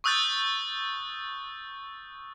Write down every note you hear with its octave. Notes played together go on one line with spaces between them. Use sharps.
C#6 D#6 E6 F#6 G6 A6